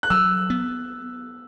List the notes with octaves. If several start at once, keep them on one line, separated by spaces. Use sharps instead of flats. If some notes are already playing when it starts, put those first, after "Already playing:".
F#6
F#3 E6
B3